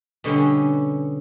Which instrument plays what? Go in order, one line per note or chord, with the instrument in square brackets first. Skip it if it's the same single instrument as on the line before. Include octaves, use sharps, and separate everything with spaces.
[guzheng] B2 D3 G3 C#4